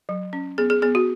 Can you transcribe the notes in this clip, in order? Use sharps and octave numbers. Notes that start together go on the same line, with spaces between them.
F#3
C#4
B3 G#4
G#4
B3 G#4
F#4